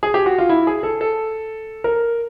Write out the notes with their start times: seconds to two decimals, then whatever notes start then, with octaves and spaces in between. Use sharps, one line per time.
0.03 G#4
0.14 G4
0.26 F#4
0.38 F4
0.49 E4
0.67 G#4
0.83 A4
1.01 A4
1.84 A#4